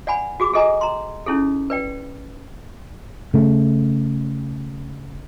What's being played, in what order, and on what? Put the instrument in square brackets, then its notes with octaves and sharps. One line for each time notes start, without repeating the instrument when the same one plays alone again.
[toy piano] D5 F#5 G#5 B5
F#4 G#4 D6
G#4 A4 D#5 G#5 A#5
A#5 C6
C#4 D#4 E4 G#4 A4
B4 D5 G5
[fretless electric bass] C#3 A3